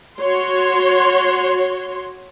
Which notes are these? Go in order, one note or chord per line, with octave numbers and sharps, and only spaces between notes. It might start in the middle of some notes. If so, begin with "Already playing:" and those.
F#4 C#5 C6